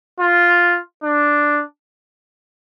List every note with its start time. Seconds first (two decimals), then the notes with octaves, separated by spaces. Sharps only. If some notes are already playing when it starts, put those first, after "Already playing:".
0.20 F4
1.03 D4